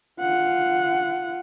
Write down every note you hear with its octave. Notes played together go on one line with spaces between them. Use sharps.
F4 F#5